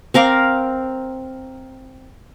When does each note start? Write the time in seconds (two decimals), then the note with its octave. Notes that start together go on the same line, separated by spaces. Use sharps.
0.14 C4 A#4 F5 D6